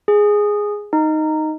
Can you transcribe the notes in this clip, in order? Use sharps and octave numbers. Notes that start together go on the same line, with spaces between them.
G#4
D#4